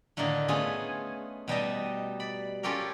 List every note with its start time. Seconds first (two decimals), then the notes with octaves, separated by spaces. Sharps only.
0.17 A2 D3 D#3 A#3 D#4
0.48 A3 B3 C#4 F4 G#4
1.48 B2 G3 D#4 D#5
2.20 D5 B5
2.63 C#4 F4 G4 A4 A#4